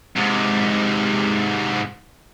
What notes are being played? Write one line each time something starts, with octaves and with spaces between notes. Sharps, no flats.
G#2 C3